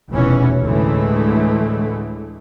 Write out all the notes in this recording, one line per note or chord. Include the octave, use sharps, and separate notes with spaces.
F1 E2 B2 E3 C#4
D2 A2 D3 E3 G#3 A3